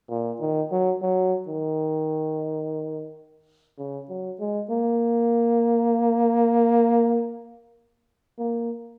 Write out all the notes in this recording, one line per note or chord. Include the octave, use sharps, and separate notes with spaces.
A#2
D#3
F#3
F#3
D#3
C#3
F#3
G#3
A#3
A#3